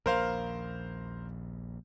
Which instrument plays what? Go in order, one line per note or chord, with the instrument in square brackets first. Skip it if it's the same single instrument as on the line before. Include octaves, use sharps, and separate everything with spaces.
[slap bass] A#1 D#2 [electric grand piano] A#4 C5 F5